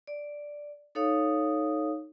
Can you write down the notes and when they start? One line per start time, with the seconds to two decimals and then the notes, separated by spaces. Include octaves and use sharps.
0.07 D5
0.95 D#4 A4 C#5 F5 D#6